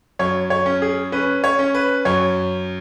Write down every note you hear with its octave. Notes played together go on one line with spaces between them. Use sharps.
F#2 C#5
C#5
C#4
G#4
C#4 B4
C#5
C#4
B4
F#2 C#5